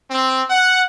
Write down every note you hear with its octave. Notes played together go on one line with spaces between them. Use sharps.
C4
F#5